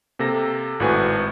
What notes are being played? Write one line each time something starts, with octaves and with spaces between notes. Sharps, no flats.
C3 A#3 A4 A#6
G#1 A2 F#4 B4 G#5